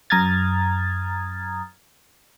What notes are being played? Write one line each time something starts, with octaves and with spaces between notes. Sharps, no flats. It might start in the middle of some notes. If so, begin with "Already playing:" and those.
F#2 A#5 D#6 F6 G#6 A6